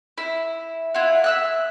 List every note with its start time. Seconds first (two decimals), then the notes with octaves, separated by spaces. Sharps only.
0.18 E4
0.94 E4 F4 F#5
1.24 E5 E6 F#6